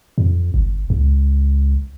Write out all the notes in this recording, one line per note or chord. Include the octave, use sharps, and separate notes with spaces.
F2
G1
C#2